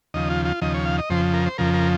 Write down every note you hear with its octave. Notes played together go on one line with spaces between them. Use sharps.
D#2 C#3 F3 D#5
F4
F4
D#2 C#3 F3 D#5
C#5
F5
D#5
F2 C#3 F3 C5
A#4
C5
F2 C#3 F3 A#4
A#4